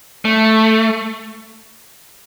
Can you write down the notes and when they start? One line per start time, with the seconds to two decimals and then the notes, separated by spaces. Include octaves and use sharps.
0.25 A3